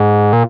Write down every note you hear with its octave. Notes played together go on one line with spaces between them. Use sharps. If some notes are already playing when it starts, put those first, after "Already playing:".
Already playing: G#2
A#2